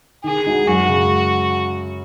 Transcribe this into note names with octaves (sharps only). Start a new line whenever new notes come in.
D#3 G#4
G#3 D#4 F#4
F#2 F#4
C#3 G#3